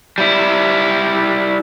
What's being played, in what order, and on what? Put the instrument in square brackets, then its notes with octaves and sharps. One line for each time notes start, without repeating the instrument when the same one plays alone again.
[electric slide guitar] G3 E4